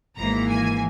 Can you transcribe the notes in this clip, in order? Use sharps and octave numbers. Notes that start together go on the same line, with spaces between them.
G#1 G#2 E3 A#3 A#5
G#5